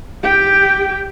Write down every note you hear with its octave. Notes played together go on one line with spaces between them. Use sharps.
G4 G5